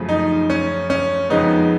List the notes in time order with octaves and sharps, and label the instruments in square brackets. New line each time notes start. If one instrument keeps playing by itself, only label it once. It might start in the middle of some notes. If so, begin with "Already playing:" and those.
Already playing: [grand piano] F#2 C#3 F3 A3
D#4
C#4
C#4
F2 C#3 F3 G#3 B3 D#4